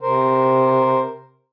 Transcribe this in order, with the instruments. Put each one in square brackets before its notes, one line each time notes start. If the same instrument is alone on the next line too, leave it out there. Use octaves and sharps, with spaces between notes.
[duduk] C3 [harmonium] A#4 C5